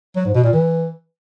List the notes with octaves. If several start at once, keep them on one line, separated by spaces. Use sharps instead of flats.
F#3
G#2
B2
A#2
E3